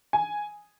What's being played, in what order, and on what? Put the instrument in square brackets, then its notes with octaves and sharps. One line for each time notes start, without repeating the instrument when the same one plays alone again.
[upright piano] G#5